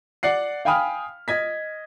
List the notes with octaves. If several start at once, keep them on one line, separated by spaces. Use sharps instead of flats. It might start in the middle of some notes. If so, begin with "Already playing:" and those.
D5 F#5 C7
F5 G5 G#5 B5 D#6 F6
D#5 G#6 B6